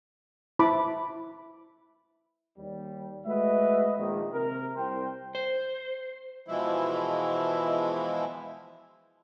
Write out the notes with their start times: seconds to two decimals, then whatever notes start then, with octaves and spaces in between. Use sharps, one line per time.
0.59 E4 C5 A5 B5 D6
2.58 D#2 G3
3.26 G#3 A3 F#4 B4 D#5 E5
3.98 A#1 D#3
4.33 C3 A#4
4.76 C2 C5 G5
5.35 C5
6.47 B2 E3 F3 G#3 E4